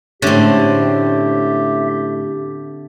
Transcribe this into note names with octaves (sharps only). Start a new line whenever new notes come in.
A2 D3 G#3 C4 C#4 G4 E5